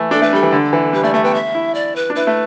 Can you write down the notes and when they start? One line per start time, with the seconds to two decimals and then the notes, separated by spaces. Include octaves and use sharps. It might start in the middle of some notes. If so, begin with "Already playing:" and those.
Already playing: E3 A3
0.11 D4 A4
0.22 A3 B4
0.33 G3 A4
0.43 E3
0.52 D3
0.73 E3
0.93 G3 B4
1.04 A3 D5
1.14 A3 E5
1.24 B3 G5
1.35 E5
1.55 E4
1.75 D5
1.96 B4
2.10 D4
2.16 E4 B4
2.27 A3